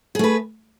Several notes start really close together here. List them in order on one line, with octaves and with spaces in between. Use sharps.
G#4 A3 B4